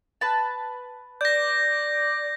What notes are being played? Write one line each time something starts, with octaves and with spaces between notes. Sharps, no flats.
B4 A5
D5 G6 A#6